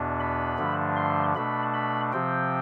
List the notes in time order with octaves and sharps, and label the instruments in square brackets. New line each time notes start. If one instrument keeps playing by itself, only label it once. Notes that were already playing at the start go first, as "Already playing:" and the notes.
Already playing: [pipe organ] E2 B2 B3 D4
B5
G2 D3 F3 A3 D4
C6
B2 A3 D4 B5
B5
C3 F3 C4 G5